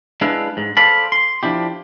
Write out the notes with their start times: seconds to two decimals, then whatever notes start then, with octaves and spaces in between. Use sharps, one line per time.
0.21 G#3 D4 E4 B4 E5 F5
0.57 G#2
0.77 A4 C5 D5 F5 A5 B5
1.12 C6
1.43 F3 D4 E4 G4